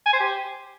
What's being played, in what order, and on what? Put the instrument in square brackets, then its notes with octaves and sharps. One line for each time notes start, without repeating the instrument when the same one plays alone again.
[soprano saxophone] G#5
C5
G4